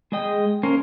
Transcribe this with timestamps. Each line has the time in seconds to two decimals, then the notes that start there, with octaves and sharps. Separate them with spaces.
0.12 G#3 G#4 D#5 G5
0.63 A#3 C#4 A#4 C5 F5